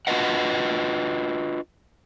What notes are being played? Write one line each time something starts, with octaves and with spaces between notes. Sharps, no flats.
D4 F4 F#4 B4 D#5 F#5